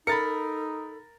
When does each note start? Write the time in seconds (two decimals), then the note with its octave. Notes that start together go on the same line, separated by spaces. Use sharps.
0.07 D#4 A4 A#4 B5 A6 C#7